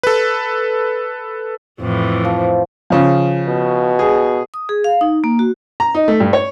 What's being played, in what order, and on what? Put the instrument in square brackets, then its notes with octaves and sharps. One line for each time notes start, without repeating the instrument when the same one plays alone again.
[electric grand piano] A4 B4
[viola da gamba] F2 A2 E3
[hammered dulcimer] F3
[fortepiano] C#3 F3
[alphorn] B2
[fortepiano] G#4
[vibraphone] D#6
G#4
F5
D#4
A#3
F#4
[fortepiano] A#5
D#4
A3
G2
C#5